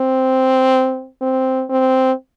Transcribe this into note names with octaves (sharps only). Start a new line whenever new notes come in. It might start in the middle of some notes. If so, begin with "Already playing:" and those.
Already playing: C4
C4
C4